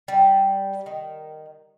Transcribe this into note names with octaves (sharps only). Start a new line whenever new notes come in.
G3
D#3